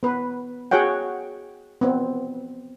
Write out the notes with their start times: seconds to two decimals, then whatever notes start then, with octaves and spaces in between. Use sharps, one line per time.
0.03 B3 B4
0.71 F#4 G#4 C#5 F#5 G5
1.81 B3 C4